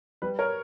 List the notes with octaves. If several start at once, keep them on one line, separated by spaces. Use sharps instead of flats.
G3 B4
A#4 C#5